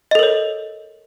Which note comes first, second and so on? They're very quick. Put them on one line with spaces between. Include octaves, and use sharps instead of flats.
D#5 A4 A#4 C#5